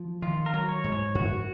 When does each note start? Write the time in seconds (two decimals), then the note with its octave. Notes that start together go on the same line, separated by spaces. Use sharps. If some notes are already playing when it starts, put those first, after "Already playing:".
Already playing: F3
0.22 D#3 F4
0.46 A#4
0.54 F#3
0.69 C#5
0.84 G#2
0.92 C#5
1.15 F#2 F#4